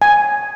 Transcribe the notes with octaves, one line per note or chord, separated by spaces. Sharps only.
G#5